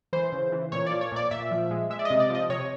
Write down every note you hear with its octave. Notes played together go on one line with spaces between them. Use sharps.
E3 C5
C#3
E3
A#2 C#5
D5
F3
C#5
A#2 D5
A#2 E5
F3
G#3
G#3 E5
D5
D#5
C3
D5
F3 D#5
C3 C#5